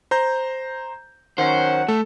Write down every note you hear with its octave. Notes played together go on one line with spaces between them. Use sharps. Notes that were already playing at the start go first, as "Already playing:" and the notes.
C5 A#5 G6
D#3 F#3 C#4 C5 F#5
A3 A4